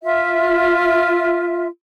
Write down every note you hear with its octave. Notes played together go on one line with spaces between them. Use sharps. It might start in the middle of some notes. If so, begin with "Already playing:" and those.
F4 E5